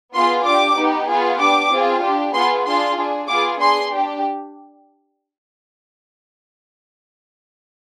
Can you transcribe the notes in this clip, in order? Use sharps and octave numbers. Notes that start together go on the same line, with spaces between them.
B3 F4 G#4 C6
D4 G4 D6
B3 D#4 G4
B3 F4 G#4
D4 G4 D6
C4 F4 G#4
D4 G4
B3 F4 G#4 C6
D4 F4 G#4 C6
D4 G#4
B3 F4 G#4 D6
D4 G#4 C6
D4 G4